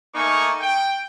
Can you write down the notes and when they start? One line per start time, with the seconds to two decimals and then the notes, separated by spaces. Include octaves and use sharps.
0.15 A3 A#3 D#4 G#5 C#6
0.61 G5